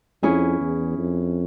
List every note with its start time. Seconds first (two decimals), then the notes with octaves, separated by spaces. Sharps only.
0.22 F2 C#4 E4 G#4
0.60 E2
0.98 F2